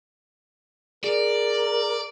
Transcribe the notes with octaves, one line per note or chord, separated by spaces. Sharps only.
G#4 A#4 D5